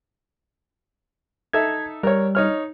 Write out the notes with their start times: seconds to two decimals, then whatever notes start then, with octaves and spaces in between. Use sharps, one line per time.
1.53 D#4 A4 E5 G#6
2.03 G3 A#4 C#5
2.35 D#4 C#5 F6